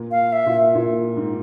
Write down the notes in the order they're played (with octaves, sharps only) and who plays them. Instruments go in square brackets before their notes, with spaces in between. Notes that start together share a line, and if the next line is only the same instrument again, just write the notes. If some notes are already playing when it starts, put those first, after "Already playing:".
Already playing: [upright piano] A#2
[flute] F5
E5
[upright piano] A#2
A#2
G#2